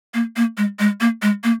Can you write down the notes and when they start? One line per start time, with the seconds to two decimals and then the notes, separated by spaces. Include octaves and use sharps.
0.14 A#3
0.36 A#3
0.58 G#3
0.79 G#3
1.01 A#3
1.22 G#3
1.44 A#3